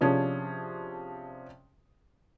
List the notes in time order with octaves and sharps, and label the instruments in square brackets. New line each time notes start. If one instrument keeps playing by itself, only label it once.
[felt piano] C3 F3 C#4 D4 G#4